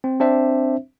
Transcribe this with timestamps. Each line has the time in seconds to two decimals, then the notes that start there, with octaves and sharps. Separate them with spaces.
0.04 C4
0.20 C4 D4 C5 E5